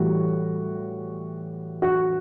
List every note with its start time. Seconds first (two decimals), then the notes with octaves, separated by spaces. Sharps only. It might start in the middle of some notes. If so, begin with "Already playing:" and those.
Already playing: A2 E3 G3 F#4
1.82 F#4